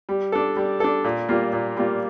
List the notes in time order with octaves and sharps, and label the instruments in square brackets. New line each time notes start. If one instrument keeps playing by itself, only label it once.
[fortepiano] G3
D4 A4
G3
D4 A4
A#2
G3 A#3 F4
A#2
G3 A#3 F4